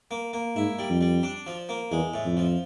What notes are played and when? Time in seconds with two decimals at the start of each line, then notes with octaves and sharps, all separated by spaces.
0.11 A#3
0.33 A#3
0.56 G#2 E4
0.79 G3
0.90 F2
1.01 G3
1.23 D4
1.46 F3
1.69 A#3
1.91 E2 G#3
2.14 A2
2.25 F2
2.37 F3